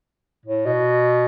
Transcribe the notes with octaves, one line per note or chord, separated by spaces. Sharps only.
A2
B2